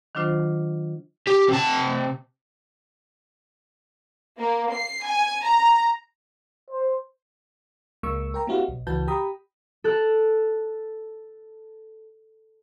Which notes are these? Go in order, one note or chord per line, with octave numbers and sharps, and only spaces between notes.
D#3 F#3 D4 F4 C5
G4
C3 A5
A#3
C7
G#5
A#5
C5
C#2 G#3 A#3 C#6 E6
A#4 G5 A#5
A#3 C4 E4 F#4 G4 F5
B1
C#2 E3 F#4 B4 A5 G6
G4 G5 A#5 B5 D#6
A4 F#6